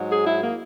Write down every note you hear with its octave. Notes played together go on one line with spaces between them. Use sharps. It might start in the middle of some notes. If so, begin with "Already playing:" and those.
Already playing: G#2 F#3
G#4
E4
A#3